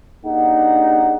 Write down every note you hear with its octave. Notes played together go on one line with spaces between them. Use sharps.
A#3 D4 D#4 G4 G#4 F#5